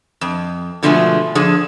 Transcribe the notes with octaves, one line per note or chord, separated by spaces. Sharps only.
F2
B2 D3 F3 G#3 A3 G#4
D3 F3 G#4